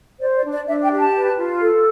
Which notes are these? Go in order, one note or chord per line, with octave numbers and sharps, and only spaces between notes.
C5 D5
D5
D4
D5
D4 E5
G5
G4
A5
B4
F4
A4